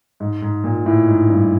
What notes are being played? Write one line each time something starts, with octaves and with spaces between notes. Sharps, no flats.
G#2
G#2
A#2
A2
G#2
G2